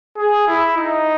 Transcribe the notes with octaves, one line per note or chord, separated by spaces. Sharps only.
G#4
E4
D#4